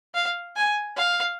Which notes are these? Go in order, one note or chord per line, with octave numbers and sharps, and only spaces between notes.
F5
G#5
F5